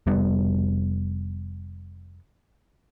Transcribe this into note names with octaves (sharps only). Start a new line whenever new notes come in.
F1 G3 B3